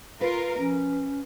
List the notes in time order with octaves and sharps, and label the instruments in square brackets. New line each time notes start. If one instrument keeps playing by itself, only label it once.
[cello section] F4 A#4 [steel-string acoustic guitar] B4
[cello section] F3 [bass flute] C#4